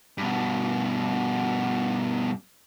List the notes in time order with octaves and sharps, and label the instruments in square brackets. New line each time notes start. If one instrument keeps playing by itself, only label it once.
[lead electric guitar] G2 B2